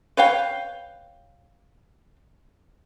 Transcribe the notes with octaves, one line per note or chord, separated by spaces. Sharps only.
B4 C#5 F5 G5